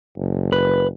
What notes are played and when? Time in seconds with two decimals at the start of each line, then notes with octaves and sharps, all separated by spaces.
0.17 F#1
0.52 B4